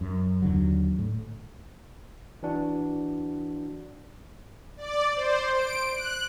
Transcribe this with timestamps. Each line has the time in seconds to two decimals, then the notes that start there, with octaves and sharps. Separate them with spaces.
0.01 F#2
0.42 D#2 D3 F#3
0.99 A2
2.43 E3 D4 F#4
4.77 D5
5.15 C5
5.53 D7
5.94 F#6